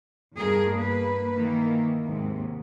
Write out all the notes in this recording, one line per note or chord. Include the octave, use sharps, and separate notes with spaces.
E2 G2 G#4 A#4
A#3 B4
D#3 E3 A#3
D#2 G#2 C3